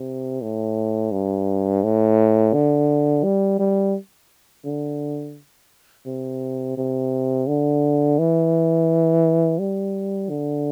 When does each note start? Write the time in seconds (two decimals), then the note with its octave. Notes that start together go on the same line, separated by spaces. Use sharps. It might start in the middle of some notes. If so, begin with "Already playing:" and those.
Already playing: C3
0.42 A2
1.12 G2
1.83 A2
2.54 D3
3.24 G3
3.59 G3
4.65 D3
6.06 C3
6.78 C3
7.48 D3
8.19 E3
9.59 G3
10.30 D3